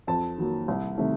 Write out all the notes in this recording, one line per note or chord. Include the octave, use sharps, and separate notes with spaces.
F2 A5
D#3 F#3 A#3
C2
C3 D#3 A3